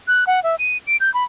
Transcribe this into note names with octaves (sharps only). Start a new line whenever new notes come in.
F#6
F#5
E5
D#7
D7
G6
B5